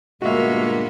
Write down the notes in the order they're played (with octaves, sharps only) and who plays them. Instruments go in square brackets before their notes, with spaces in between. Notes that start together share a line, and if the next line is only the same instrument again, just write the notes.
[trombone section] D2 G2 A#2 [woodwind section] G#3 [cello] A#3 B3 [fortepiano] F#4 E5